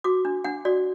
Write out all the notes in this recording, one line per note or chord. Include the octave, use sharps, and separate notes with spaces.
F#4 D6
D4
D4 F#5
F#4 D5